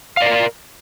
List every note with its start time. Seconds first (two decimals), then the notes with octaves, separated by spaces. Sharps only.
0.17 F5
0.22 D5
0.26 A#4